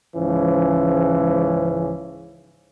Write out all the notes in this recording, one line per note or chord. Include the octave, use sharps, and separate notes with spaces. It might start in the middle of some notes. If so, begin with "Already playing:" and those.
C#2 G#2 E3 F3 C#4